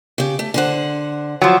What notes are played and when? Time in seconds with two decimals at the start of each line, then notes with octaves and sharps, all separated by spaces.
0.18 C#3 G4
0.39 A3
0.54 D3 C5 F#5
1.41 F3 F#3